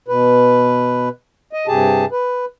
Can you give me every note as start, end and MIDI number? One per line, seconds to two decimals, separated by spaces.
0.08 1.09 47
0.08 1.09 71
1.53 1.67 75
1.67 2.05 43
1.67 2.05 48
1.67 2.05 67
1.67 2.05 68
1.67 2.05 81
2.11 2.45 71